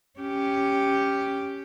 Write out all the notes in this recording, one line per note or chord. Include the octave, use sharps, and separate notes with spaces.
C#4 G4